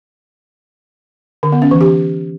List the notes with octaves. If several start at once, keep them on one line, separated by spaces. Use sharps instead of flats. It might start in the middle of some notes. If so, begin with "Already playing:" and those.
D3
B3
C#4
E3
G4